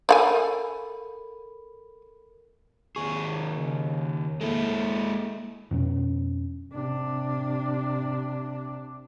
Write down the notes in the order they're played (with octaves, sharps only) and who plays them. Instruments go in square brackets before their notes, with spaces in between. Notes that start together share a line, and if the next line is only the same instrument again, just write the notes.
[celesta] A4 A#4 B5 [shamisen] D5 F#5 G#5
[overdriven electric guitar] D#2 G#4 [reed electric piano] C#6
[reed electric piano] C#3
[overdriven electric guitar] G#3 E4 [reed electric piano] A#3 A4
[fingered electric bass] F2 B2 C#4
[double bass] C3 D4